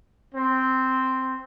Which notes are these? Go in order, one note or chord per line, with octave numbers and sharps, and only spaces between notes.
C4